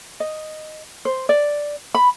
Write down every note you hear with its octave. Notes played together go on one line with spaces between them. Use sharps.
D#5
C5
D5
B5